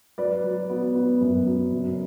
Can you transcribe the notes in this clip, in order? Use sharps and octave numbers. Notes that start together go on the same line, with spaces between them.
F#3 B4 D5
F#3
B3
B3
F#2
F#3
F#1